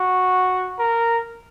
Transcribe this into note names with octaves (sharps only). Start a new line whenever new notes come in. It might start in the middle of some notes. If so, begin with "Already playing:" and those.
Already playing: F#4
A#4